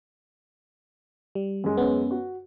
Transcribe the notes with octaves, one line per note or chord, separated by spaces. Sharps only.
G3
F#2 G#3
B3 C#4
F#4